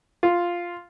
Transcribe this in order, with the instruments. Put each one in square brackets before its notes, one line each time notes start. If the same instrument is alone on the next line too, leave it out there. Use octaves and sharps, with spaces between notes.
[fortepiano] F4